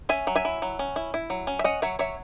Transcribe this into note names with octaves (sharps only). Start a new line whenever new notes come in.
C#4 E5 G#5
F#3
E5 G#5
E4
F#3
C#4
E4
E4
F#3
C#4
E5
C#4 D#5 F#5
F#3 C#5 E5
F#3 C#5 E5